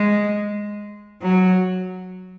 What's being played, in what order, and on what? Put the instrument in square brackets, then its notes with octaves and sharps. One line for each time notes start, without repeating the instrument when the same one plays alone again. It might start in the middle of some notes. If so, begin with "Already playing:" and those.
Already playing: [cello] G#3
F#3